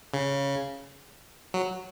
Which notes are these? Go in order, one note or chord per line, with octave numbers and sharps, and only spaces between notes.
C#3
F#3